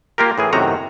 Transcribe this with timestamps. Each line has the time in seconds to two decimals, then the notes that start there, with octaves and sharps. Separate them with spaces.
0.18 A#3 F4 G4 A#4
0.38 A2 E3 G#4
0.53 F#2 A2 C3 D#3 F#4 A#5